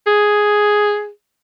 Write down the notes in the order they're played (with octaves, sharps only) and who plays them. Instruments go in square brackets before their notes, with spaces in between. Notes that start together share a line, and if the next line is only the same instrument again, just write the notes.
[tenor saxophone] G#4